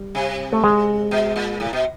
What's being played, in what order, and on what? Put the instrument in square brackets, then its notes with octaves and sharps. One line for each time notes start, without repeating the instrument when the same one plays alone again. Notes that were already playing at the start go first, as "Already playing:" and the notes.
Already playing: [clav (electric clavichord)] G3
[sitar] C3
[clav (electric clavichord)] A3
G#3
[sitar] B2
A#2
A2
B2